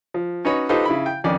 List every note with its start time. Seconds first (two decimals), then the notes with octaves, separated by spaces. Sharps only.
0.14 F3
0.45 C#4 D#4 F#4 B4 C#5
0.69 D#4 F4 G4 A4 B4 C5
0.85 C#3 E4 B5
1.06 G5
1.24 F2 D#3 C#4 D5